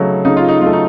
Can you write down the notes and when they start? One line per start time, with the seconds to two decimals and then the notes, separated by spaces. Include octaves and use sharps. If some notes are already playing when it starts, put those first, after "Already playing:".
Already playing: C#3 F#3 A3 D#4
0.25 C#3 D#4
0.37 F4
0.48 D#4
0.61 F#3 A3 F4
0.73 D#4